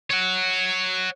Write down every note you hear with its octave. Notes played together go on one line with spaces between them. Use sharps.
C#5 F#5